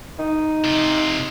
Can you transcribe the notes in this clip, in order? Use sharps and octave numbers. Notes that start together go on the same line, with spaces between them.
D#4
C3 F4